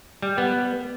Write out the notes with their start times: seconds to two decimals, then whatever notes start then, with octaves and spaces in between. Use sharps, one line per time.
0.22 G3
0.38 B3